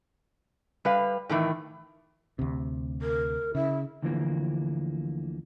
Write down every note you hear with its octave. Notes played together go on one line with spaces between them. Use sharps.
G3 B4 F5
A2 D#3 E3
D2 C3
A#4
C#3 E4
D2 D3 E3 F3 A#3